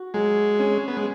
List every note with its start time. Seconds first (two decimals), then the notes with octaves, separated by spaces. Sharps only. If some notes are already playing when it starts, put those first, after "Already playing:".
Already playing: F#4
0.14 F#3 G#3
0.59 C#4
0.88 B3
0.97 G#3